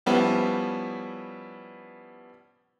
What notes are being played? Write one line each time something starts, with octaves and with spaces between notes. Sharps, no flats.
F3 G3 B3 C#4 E4